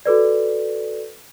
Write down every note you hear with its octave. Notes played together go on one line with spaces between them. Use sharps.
F#4 A4 B4 D5